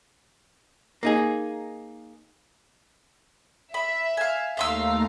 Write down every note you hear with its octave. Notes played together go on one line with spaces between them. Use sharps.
A#3 D#4 G#4
E5 B5
F5 G#5
D#2 A3 E5 F5 A#5 C6 E6